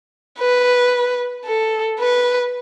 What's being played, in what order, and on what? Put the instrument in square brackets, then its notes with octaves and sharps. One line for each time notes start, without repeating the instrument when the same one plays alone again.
[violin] B4
A4
B4